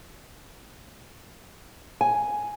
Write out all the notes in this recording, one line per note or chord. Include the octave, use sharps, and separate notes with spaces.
G#5